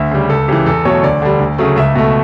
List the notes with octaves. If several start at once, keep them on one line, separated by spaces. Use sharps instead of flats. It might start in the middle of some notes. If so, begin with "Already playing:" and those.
Already playing: D2 E5
C#3 G3
C#2 A4
C#3 E3 G4
E2 A4
B2 F#3 A3 C#5
D2 D5
D3 G3
D2
C#3 F#3 A3
C#2 E5
B2 A3